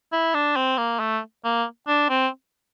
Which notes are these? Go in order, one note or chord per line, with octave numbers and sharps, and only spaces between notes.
E4
D4
C4
A#3
A3
A#3
D4
C4